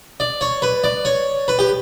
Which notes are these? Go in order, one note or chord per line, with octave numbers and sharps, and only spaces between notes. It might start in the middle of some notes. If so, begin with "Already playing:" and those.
D5
C#5
B4
D5
C#5
B4
G4